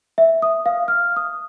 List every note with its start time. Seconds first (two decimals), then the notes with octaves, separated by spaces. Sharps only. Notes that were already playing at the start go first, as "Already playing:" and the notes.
0.18 E5
0.42 D#6
0.66 F5
0.88 F6
1.16 D#6